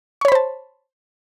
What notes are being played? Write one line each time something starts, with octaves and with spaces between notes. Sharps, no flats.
C5 C#5 A5 B5 C#6